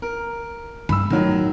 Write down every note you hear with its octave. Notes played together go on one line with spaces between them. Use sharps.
A#4
G2 B5 E6
A2 D#3 F#3